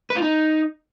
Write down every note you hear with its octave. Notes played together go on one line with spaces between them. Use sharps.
B4
F4
D#4